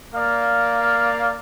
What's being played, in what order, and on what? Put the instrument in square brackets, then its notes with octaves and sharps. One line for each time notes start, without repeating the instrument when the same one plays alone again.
[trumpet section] A#3 D5 F5